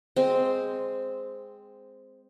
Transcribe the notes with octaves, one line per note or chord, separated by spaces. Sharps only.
G#3 C4